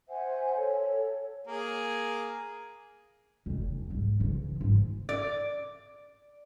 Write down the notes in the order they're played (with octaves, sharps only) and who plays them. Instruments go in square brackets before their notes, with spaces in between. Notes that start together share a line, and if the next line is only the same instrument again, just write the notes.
[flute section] C5 E5 F#5 G#5
A4 C#5
[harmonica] A#3 G#4
[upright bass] F1 D#4
E2
B1 G#2
C#3 E3
G#2 E3
[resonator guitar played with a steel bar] D5